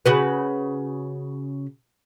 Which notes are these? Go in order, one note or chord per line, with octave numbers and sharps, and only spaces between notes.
C#3 F#4 B4